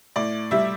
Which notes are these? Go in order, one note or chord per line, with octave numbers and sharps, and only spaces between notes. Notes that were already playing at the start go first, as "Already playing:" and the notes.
A2 D5
G3 E5